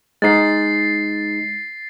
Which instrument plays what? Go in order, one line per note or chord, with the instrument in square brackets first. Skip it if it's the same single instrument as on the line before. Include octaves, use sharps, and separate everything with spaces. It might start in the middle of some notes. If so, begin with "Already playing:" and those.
[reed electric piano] G#3 D#4 [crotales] A6 C7